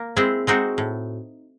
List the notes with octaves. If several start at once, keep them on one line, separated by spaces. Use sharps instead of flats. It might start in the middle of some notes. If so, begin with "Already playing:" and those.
Already playing: A#3
G#3 C4 E4 G#4
G#3 C4 D#4 F#4
A2